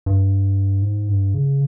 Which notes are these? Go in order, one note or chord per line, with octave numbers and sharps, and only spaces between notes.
G2
G#2
G2
C#3